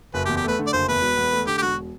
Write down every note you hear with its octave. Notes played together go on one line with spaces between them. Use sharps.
F#1 B4
G4
E2
G4
A3 B4
D3
D5
F#1 C5
E2 B4
E1
E2
A3
D3 G4
G4
E1 F#4